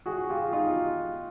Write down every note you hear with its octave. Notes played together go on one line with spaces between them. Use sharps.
F#4 G#4
F4 G4
D#4 F4